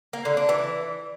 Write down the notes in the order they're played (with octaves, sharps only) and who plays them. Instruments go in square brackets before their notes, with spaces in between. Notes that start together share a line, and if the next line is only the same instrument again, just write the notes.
[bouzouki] A#3
D3
D4
E3